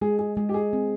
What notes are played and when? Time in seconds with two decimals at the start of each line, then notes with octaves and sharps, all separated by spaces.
0.01 G#3 G#4
0.19 G#4
0.37 G#3 G#4
0.49 G4
0.54 G#4
0.73 C4